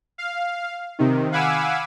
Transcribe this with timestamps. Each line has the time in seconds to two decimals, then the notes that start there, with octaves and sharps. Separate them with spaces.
0.18 F5
0.99 C3 D#3
1.32 F5 F#5 G#5 B5 D6 E6